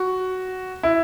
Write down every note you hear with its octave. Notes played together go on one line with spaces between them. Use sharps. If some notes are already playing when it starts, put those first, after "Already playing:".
Already playing: F#4
E4